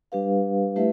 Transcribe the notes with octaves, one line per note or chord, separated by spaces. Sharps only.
G3 D4 G4 B4 F5
A3 E4 G4 B4 E5